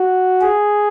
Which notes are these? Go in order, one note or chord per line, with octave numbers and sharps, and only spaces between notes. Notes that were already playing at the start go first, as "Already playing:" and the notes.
Already playing: F#4
G#4